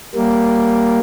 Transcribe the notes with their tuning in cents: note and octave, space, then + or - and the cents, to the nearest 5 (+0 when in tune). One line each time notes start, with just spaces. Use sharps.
G3 -5 A#3 +0